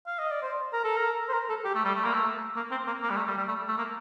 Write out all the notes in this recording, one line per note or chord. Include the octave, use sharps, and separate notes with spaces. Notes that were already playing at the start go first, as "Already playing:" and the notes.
F5
D#5
D5
C5
A#4
A4
A#4
C5
A#4
A4
G4
A3
G3
A3
A#3
A3
A#3
C4
A#3
A#3
G3
A3
G3
G3
A3
A3
A#3